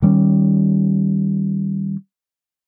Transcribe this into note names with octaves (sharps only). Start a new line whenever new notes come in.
D#3 G3 C4 C#4